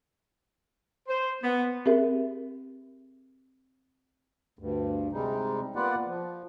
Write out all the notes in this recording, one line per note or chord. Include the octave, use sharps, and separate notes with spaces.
C5
B3
C4 G4 G#4 A#4 E5
D2 G2
C3 G3 G#3 D#4
A#3 B3 F4 B4 D5 F#5
F3